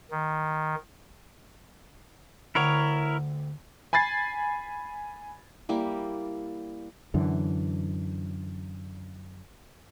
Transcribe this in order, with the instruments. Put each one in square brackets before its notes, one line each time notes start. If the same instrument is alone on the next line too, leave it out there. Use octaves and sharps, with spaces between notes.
[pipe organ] D#3
[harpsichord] D2 D3 G5 [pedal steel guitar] E4 A#4 C#5
[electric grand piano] G#5 B5 G#6 A6 C7
[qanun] G3 A#3 E4
[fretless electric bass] F#2 D3 E3